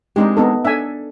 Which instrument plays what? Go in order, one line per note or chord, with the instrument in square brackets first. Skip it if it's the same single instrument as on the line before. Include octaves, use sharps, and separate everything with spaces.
[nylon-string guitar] G#3 C4 D4 [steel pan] D#4 G4
[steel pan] B3 D#4 A4
[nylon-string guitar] D4 A4 [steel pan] E5 G#5